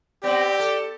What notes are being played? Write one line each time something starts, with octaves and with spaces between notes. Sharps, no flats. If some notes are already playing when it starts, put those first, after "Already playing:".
B3 C4 G4 D5
A4